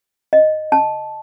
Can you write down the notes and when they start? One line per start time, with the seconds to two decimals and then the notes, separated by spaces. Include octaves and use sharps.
0.33 D#5
0.72 A5